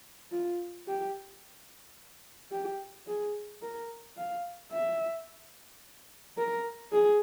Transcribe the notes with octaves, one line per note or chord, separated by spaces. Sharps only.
F4
G4
G4
G#4
A#4
F5
E5
A#4
G#4